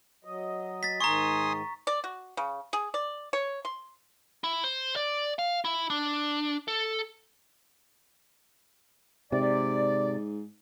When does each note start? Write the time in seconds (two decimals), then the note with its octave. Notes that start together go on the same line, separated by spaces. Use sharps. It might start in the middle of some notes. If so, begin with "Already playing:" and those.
0.25 F#3 D#5
0.83 A6 B6
1.01 G#2 D#3 G#5 A#5 C6 C#6 D#6
1.87 D5
2.04 F#4
2.37 C#3
2.73 G#4
2.94 D5
3.33 C#5
3.65 C6
4.44 E4
4.64 C5
4.96 D5
5.39 F5
5.65 E4
5.90 D4
6.68 A4
9.32 G#2 C3 D5